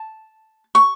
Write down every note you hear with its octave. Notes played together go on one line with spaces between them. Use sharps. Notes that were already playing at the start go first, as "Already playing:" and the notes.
Already playing: A5
C#6